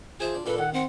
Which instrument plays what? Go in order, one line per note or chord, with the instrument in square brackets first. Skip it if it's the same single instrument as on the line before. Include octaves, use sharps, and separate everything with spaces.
[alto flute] F4 [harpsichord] G#4 E5 A5 [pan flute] C5
[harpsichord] D4
[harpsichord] A#2 D4 [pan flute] A4 [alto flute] B4
[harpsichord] D#3 [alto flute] F#5
[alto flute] C4 [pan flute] F#5